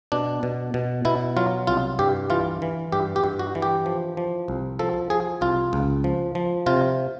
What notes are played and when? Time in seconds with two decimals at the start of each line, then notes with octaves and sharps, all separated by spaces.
0.12 B2 D4
0.43 B2
0.74 B2
1.05 B2 E4
1.37 F#3 F4
1.67 C2 F4
1.99 G2 G4
2.30 E3 F4
2.62 E3
2.92 G2 G4
3.16 G4
3.24 G2
3.39 F#4
3.55 E3
3.62 G4
3.86 F3
4.17 F3
4.48 C2
4.79 F3 A4
5.10 F3 G#4
5.41 C2 F4
5.73 C#2
6.04 F3
6.35 F3
6.66 C3 F4